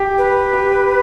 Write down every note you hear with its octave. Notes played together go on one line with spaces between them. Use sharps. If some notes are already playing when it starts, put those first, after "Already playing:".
Already playing: G4
B4
G4